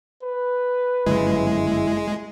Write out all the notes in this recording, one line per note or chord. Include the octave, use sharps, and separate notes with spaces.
B4
G1 F#2 C#3 G#3 E4